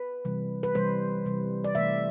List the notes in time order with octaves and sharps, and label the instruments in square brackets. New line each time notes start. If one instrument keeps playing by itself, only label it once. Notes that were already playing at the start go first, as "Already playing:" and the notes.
Already playing: [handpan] B4
C3 E3 G3
B4
C3 E3 G3 C5
C3 E3 G3
D5
C3 E3 A3 E5